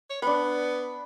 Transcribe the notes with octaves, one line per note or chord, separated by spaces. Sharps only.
C#5
B3 D4 B5